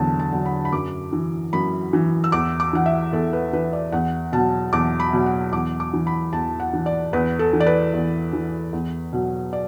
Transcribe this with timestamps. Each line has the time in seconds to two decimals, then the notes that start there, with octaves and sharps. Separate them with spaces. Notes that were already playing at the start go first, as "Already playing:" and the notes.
Already playing: E2 D3 F#3 A5
0.20 A5
0.32 D3 F#3
0.46 B5
0.65 B5
0.72 F#2 D6
1.13 E3
1.53 F#2 B5
1.93 E3
2.24 E6
2.32 E2 D6
2.60 D6
2.73 E3 F#5
2.86 E5
3.13 E2 A4
3.33 B4
3.53 E3 B4
3.73 D5
3.92 E2 F#5
4.32 B2 F#3 A5
4.73 E2 D6
5.00 B5
5.13 B2 F#3
5.26 F#5
5.52 E2 D6
5.80 D6
5.93 E3
6.07 B5
6.33 E2 A5
6.60 F#5
6.73 E3
6.86 D5
7.13 E2 B4
7.39 A4
7.53 E3
7.60 D5
7.66 B4
7.94 E2
8.33 E3
8.73 E2
9.13 B2 F#3
9.53 D5